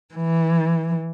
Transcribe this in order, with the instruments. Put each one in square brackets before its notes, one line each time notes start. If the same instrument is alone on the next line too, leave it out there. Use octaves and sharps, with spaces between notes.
[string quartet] E3